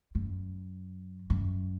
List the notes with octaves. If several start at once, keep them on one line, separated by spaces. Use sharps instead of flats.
F#2
F#2